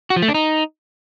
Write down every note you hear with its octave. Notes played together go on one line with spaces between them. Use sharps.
F#4
F3
A3
D4
D#4